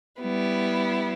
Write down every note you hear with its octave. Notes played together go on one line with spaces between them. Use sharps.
G3 B3 E4